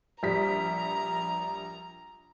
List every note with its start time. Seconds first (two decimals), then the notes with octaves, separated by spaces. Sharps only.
0.23 A#1 G3 A#5 B6